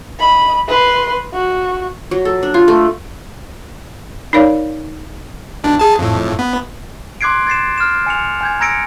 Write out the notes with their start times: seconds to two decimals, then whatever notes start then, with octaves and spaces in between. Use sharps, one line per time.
0.20 D#5 B5
0.68 B4 C6
1.34 F#4
2.11 F#3
2.25 A4
2.43 D4
2.54 F4
2.68 A3
4.33 D#4 A#4 C#5 D5 F5
5.64 B1 D4
5.79 G#4 A5
5.99 F2 A2
6.39 B3
7.21 C6 D6 F#6 G#6 C7 D7
7.47 G#6 A6 C7 E7
7.78 F6 E7
8.06 G#5 C#7 F7
8.41 G#5 G6 G#6
8.60 A#5 E6 G#6 A#6 C#7 D7